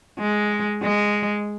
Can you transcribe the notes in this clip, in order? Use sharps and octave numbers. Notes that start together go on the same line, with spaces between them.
G#3
G#3